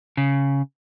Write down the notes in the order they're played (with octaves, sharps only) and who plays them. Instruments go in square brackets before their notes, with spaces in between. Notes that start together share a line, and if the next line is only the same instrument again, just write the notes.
[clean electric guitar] C#3